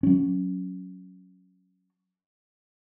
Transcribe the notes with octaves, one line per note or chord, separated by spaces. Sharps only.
F#3 C#4